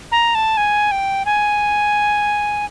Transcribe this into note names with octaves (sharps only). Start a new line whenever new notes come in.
A#5
A5
G#5
G5
G#5